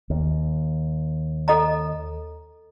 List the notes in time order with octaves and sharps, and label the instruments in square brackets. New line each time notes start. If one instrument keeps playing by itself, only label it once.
[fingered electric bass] D#2
[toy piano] A4 D#5 A#5